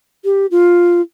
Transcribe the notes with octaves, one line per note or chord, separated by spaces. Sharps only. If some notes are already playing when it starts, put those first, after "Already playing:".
G4
F4